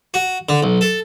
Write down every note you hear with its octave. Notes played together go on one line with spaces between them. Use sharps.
F#4
D3
B1
A4